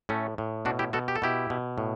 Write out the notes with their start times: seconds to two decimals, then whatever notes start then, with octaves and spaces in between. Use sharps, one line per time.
0.09 A2 A3 C#4
0.38 A2
0.65 B2 D4 F#4
0.79 E4 G4
0.93 B2 F#4 A4
1.08 G4
1.16 A4
1.22 B2 E4 G4
1.50 B2
1.78 A2